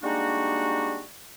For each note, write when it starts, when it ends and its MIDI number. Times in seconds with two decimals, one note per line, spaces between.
0.03 1.01 55
0.03 1.01 56
0.03 1.01 58
0.03 1.01 62
0.03 1.01 63
0.03 1.01 66